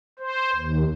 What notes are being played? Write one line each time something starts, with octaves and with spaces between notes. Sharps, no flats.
C5
D#2